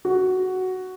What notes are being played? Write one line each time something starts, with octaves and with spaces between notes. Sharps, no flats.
F#4